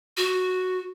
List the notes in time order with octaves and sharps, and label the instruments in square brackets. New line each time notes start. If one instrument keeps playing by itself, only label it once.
[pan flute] F#4